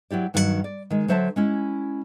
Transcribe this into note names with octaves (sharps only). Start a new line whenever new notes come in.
F#3 E4 G4 D5
G2 D#3 F#3 F#4 A#4 F#5
D5
D#3 G#3
D3 F#3 C5 E5 G#5 A5
G#3 C#4 E4